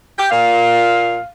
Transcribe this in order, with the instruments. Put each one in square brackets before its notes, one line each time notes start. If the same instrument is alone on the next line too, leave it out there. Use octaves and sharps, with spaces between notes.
[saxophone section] G4
[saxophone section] A#2 [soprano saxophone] F5